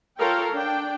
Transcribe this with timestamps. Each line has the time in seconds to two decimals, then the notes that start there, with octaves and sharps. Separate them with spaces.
0.18 F4 A4 A#4 C#5 F5 G5
0.51 D4 G5